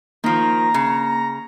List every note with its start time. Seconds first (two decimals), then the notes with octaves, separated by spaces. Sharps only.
0.24 D#3 F3 A#3 A#5
0.74 C#3